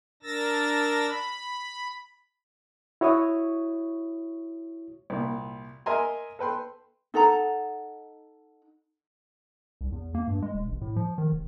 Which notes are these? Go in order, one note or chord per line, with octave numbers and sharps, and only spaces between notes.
D4 A#4 E6 A6 A#6
B5
E4 F#4 C#5 C#6 D#6
C2 A#2
A#4 D#5 E5 G#5 A#5 C6
A4 B4 G5 C6
D#4 A4 F#5 A#5
C2
E2
A#3
G2
G#3
E1
A1
A2
F3
D#3
F1